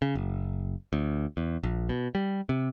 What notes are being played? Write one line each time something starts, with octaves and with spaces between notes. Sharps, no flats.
C#3
F#1
D2
E2
A#1
B2
G3
C3